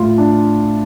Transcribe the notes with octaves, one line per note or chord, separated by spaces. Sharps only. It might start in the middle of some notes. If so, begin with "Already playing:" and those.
Already playing: A2 F4
D4